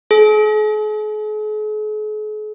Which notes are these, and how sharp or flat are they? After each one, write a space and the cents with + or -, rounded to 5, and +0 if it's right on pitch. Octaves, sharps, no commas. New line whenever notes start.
G#4 +45